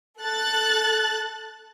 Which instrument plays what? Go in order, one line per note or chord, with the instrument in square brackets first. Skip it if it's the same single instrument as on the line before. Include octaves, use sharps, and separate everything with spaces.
[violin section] A4 F#6 A6